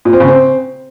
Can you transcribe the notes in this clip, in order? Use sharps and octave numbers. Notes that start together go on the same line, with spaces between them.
A#2
C4
C#3
C4